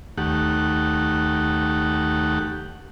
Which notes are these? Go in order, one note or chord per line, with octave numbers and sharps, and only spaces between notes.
D#2 A3 G4 F#5